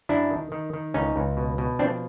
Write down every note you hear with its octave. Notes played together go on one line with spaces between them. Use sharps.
F#2 D4 E4
D#3
D#3
D#3
C#2 C#4 D#4
C#2
B2
B2
F3 C4 D4